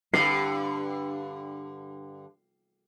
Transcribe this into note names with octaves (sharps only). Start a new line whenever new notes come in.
G2 D3 C7